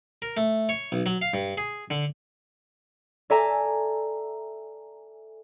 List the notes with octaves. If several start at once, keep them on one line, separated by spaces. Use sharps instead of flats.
A#4
A3
C#5
B1
F#3
F5
G2
G#4
D3
A4 D5 E5 G#5 A#5